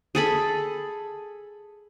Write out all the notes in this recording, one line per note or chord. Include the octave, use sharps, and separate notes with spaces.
G#4 A4 B5